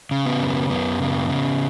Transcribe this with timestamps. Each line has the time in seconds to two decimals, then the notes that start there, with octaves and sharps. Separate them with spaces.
0.11 C#3
0.26 B3
0.41 F#2
0.70 F#2 B3
1.00 C#3
1.29 C#3